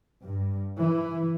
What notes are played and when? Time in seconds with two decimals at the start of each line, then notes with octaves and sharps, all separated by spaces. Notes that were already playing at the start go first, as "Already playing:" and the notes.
0.23 G2
0.79 E3